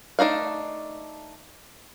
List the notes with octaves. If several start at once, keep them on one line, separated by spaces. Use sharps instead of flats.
A3 D4 D#4 F#4 F5